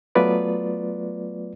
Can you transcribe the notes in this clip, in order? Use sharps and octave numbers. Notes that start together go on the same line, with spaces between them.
F#3 A3 B3 F4 B4 D5